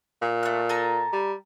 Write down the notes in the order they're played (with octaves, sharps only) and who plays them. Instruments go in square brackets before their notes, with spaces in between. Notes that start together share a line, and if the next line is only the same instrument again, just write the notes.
[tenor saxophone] A#2
[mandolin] A3 F#6
A4 G#5 A#5
[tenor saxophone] G3